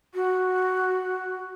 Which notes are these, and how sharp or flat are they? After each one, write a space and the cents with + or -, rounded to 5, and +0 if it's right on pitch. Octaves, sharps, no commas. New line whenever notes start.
F#4 +0